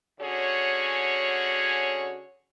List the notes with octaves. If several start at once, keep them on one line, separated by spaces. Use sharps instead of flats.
D3 C#4 F#4 G#4 C#5